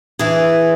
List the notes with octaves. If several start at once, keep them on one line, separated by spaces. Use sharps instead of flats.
E3 G#4